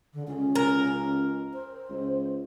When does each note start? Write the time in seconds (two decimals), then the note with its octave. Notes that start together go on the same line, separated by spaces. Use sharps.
0.13 D3
0.28 C#2 C#4
0.55 A#4
1.54 C5
1.89 C#2